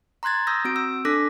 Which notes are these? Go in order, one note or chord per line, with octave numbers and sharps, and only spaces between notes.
A#5 C6 F#6 G#6 A6
A#5 D#6 E6 G6 A#6
C4 F#4 D7
E6
D4 A4 D6 F#6 A#6 B6